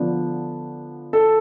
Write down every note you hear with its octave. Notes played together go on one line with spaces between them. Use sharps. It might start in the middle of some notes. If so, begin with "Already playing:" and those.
Already playing: D3 F3 B3 D4
A4